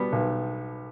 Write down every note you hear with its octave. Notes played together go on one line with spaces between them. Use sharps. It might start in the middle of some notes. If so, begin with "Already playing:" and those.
Already playing: B2 G3 B3
B1